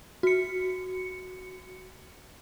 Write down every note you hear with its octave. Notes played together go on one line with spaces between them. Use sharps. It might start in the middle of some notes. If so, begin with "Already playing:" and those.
F#4 C#7